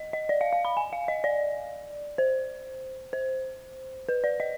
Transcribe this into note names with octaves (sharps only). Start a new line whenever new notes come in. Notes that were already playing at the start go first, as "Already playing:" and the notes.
Already playing: D#5
D#5
D5
F5
F5
B5
G#5
F5
D#5
D5
C5
C5
B4
D5
D#5